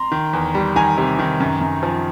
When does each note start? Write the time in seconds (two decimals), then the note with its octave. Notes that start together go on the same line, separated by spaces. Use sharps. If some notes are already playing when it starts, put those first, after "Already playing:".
Already playing: A#5 C6
0.12 D#3
0.33 E2
0.55 G3
0.76 D#3 G#5 A#5
0.97 C3
1.19 D#3
1.40 F#2
1.61 F#2
1.83 F3